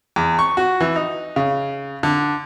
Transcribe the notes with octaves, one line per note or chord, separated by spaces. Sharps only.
E2
C#6
F#4
E3
D#4
C#3
D3